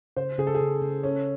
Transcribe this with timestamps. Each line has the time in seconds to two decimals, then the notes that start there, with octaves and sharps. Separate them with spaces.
0.16 C#3 C5
0.39 C#3 G#4
0.47 A4
0.54 G#4
0.61 C#3
0.82 C#3
1.03 C#4 A4